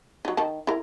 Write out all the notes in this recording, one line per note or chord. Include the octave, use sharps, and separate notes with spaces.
F#3 D#4
D#3 A5
E4 A#4